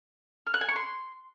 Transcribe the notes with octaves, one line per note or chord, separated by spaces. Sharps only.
F6
F#6
G#5
C#6
C6